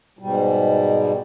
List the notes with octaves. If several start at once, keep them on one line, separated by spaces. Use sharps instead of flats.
G#2 B2 G3